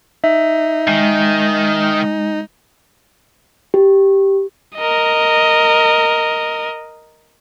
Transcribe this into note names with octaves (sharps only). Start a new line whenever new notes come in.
D#4 E5
D#3 G#3
G4
A#4 D#5